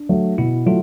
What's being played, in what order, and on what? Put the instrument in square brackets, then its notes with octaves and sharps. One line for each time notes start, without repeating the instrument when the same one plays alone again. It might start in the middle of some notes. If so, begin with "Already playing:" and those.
Already playing: [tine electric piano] D4
[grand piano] F#3 A3
[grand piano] B2 [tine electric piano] E4
[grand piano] F#3 A3 [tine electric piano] F4